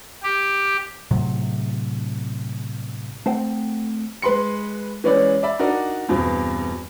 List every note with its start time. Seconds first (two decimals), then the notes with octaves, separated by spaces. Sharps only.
0.23 G4
1.11 A2 C3 F#3
3.26 A3 C4 C5 F#5 G5
4.22 G#3 B4 B5 C6 C#7
5.04 E3 G#3 C#4 B4 C#5 D5
5.43 D5 E5 B5
5.59 D4 D#4 F#4 A#4 D5
6.09 E2 G2 B2 C4